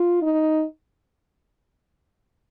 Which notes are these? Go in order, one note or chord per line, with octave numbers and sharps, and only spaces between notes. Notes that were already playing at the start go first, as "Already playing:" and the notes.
Already playing: F4
D#4